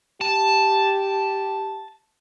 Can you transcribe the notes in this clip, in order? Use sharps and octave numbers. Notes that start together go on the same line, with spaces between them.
G4 A5